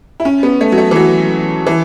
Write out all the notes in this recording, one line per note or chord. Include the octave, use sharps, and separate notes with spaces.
E4
C#4
B3
A3
F#3
A3
E3
F#3
E3